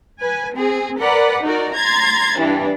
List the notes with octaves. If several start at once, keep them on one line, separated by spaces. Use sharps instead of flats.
B4 G#5
C4 G#4
A#4 B4 D5 F#5
D#4 F#4 A#4 D5
A#5 C6 G#6 A6
G2 E3 D4